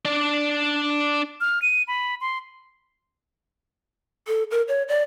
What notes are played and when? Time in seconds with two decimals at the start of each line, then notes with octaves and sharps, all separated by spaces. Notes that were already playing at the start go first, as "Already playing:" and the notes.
0.05 D4 D5
1.40 F6
1.62 D#7
1.88 B5
2.21 C6
4.27 A4
4.51 A#4
4.68 C#5
4.88 D5